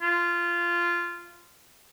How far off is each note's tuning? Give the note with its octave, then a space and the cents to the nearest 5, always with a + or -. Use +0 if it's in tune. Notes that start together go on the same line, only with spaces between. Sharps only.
F4 -15